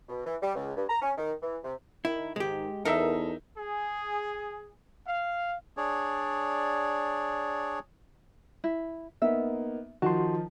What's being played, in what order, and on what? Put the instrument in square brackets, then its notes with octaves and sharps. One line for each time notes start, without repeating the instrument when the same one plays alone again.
[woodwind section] B2
E3
G3
C#2
G2
A#5
C#4
D#3
E3
C3
[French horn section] D#3 [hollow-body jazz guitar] E4
[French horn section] G#2 D#3 [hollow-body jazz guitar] G#3 G4
[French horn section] E2 [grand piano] D#4 E5 [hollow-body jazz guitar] A4 [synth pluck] A#4
[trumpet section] G#4
F5
[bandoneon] D4 G#4 C#5 D5
[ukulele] E4
[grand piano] A#3 B3 D#4 [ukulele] E5
[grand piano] D#3 F3 [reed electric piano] F#4 C6 [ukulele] A5